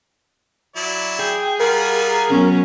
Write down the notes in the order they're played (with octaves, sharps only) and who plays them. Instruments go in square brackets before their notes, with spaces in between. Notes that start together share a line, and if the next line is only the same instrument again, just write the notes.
[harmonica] F#3 E4 D5
[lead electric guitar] G#4 [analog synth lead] G5
[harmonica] G3 F4 F#5 [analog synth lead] A#4
[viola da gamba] B2 F#3 C#4